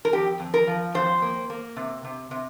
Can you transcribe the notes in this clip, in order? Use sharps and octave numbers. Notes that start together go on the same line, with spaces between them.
A#4
F2 G4
F2
A#4
F3
F2 C5
A#3
A#3
C3
C3
C3